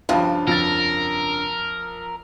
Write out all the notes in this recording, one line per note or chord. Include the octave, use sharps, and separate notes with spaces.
G2 C#3 F3 F4
F2 A#4 A6